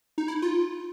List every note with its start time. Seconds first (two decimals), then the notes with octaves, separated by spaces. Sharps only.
0.18 D#4
0.28 E4
0.42 F4